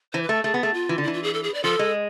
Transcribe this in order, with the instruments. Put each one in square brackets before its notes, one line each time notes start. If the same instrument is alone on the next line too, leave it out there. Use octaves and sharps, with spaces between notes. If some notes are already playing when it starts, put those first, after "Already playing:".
[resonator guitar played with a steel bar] E3 [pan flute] C5
[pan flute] B4
[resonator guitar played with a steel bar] A3 [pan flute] A4
[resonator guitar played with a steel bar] A3 [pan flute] G#4
[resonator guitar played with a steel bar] B3
[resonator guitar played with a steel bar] A3 [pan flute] G#4
[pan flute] F4
[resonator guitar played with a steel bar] E3
D3
[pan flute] E4
[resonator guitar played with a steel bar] E3
[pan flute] F4
G#4
A4
G#4
D5
[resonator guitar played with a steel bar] F3 [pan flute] A4
[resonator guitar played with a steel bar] G#3